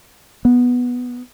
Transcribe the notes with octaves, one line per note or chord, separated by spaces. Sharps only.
B3